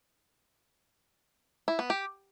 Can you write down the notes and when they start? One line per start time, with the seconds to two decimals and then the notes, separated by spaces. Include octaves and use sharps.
1.68 E4
1.79 B3
1.90 G4